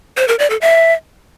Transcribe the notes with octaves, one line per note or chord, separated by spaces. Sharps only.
C5
A#4
D5
A4
E5